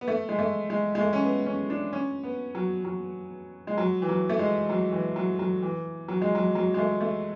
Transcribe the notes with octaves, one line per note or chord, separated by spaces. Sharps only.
B3
A3
G#3
A3
G#3
G#3
A3
C#4
B3
C#4
D4
C#4
B3
F#3
F#3
G#3
F#3
E3
F#3
A3
G#3
F#3
E3
F#3
F#3
E3
F#3
G#3
F#3
F#3
G#3
A3
A3